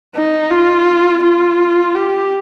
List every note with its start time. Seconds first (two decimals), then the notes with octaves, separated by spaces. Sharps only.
0.15 D#4
0.51 F4
1.23 F4
1.95 G4